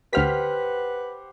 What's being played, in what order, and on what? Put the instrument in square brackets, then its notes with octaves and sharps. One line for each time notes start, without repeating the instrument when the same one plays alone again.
[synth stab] D2 F6 B6 [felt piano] G4 C5 F#5 [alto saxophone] B4